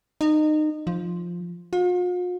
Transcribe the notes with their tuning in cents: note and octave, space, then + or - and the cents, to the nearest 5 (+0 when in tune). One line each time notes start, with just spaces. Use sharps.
D#4 -25
F3 +0
F4 +45